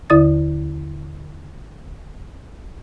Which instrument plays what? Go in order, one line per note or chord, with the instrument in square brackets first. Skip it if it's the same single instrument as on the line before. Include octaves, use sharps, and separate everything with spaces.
[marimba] D#2 D3 E4 D5 D#6 A6